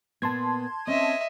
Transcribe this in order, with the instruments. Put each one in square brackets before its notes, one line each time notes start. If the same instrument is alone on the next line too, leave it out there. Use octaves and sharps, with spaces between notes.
[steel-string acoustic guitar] A#2 B3 [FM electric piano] A5 C6 G#6
[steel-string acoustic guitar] C4 C#4 [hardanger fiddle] D#5 E5